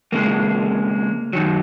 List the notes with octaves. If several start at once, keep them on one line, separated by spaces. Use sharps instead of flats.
F2 C#3 G#3 A#3
F#2 D#3 F#3